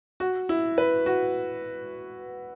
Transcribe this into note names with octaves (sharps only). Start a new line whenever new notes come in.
F#4
E4
B4
F#4